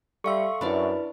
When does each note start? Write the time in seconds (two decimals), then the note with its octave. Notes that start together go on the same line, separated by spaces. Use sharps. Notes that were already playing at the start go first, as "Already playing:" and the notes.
0.24 G3 A4 E5 F5 C6 C#6
0.61 F#2 D4 E4 B4 D5 B5